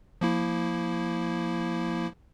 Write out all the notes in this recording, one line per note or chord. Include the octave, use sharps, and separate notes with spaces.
F3 A#3 E4